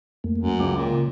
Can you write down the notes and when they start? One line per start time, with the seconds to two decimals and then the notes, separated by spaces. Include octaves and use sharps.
0.24 F2 A3 A#3
0.38 F#2
0.59 C#2 G#3 G5 D6
0.77 A#2
0.91 C#3